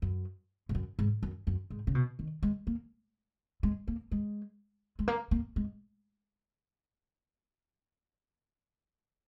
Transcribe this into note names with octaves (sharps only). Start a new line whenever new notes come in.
F#2
G#2
F#2
G#2
F#2
F#2
G#2
C#3
B2
D#3
G#3
A#3
G#3
A#3
G#3
G#3
A#3
A#3
G#3